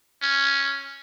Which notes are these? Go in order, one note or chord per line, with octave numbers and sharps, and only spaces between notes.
C#4